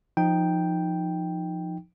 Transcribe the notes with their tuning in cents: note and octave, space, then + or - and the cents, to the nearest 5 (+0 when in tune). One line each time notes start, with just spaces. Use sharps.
F3 +0 D#4 +0 G5 +0